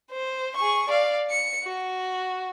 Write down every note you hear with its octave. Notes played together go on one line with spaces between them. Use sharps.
C5
G#4 C#6
D5 F5
C#7
F#4